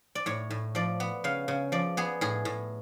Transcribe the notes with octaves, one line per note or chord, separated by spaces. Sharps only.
D5
A2 C#5
A2
F3 D5
B3
C#3 F5
C#3
F3 D5
B3 G#4
A2 G#4
A2